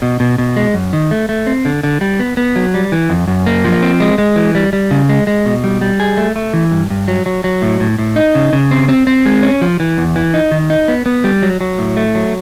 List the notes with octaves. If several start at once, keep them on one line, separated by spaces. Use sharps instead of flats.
B2
B2
B2
G#3
F#2
D#3
A3
A3
C4
D3
D3
G3
B3
B3
F#3
G3
E3
F2
F#2
A#3
F3
C4
G#3
G#3
E3
G3
G3
C#3
G#3
G#3
B2
G3
G3
G#4
A3
A3
E3
G2
G2
F#3
F#3
F#3
A2
A2
A2
D#4
C#3
C#3
C4
C4
C4
G#3
C#4
F3
E3
E2
E3
D#4
D#3
D#4
B3
B3
G3
F#3
F#3
A2
A3
F#3